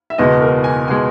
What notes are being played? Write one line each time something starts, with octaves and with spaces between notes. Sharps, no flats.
E5
F#1 E2 B2 G#3 D#5
A#4
G#5
B2 G#3 G#5